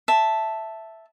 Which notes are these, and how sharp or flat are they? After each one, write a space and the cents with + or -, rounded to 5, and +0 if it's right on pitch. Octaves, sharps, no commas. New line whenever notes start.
E5 +0 A5 +0